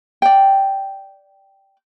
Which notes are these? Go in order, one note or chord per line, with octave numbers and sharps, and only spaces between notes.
D5 G5